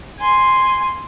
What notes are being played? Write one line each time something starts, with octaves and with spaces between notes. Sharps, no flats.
G#5 C6